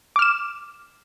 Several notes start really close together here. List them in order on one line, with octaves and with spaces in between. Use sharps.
D6 F6 E7